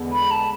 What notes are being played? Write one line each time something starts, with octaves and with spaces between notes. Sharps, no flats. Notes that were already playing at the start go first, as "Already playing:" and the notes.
Already playing: E2 D3 G#3 B3
B5
A5